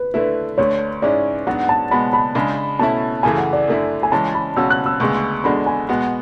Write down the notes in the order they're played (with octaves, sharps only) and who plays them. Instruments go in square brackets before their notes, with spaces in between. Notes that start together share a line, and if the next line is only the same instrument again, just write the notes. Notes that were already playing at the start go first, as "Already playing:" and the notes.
Already playing: [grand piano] B4
[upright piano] D3 A3 E4 [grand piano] B4
[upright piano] D2 D3 A3 [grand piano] C#5
[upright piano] G#2 G#3 C#4 E4 [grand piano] D5
[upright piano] G#2 F#3 B3 D4 F#4 [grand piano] F#5
[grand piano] A5
[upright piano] B2 G#3 B3 F#4 [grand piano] B5
[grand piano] B5
[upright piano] C#3 G#3 D4
[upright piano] B2 A3 C#4 E4 [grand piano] A5
[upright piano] F#2 C#3 E3 A3 [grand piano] G#5
[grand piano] F#5
D5
[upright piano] F#2 D3 A3 E4
[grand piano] G#5
[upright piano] C#3 E3 G#3 C#4 [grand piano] A5
[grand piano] B5
[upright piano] C#2 B2 F#3 C#4 F#4 [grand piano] E6
[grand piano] F#6
E6
[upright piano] D2 C#3 G#3 B3 [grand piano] C#6
[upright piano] E2 D3 G#3 D4 F#4 [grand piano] B5
[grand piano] G#5
[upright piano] B2 G#3 B3 F#4 [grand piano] F#5